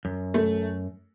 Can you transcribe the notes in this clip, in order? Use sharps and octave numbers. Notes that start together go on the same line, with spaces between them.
F#2
A3